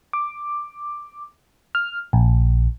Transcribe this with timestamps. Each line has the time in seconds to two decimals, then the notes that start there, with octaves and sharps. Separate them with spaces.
0.13 D6
1.75 F6
2.13 A#1